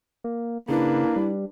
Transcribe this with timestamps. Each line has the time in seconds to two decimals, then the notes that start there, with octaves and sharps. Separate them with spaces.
0.24 A#3
0.69 C#3 A#3 D4 E4 B4
1.16 G3